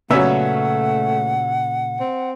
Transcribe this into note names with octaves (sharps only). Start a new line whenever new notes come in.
A#2 C#3 F#3 A3 B3 C#4 E5 F#5
C4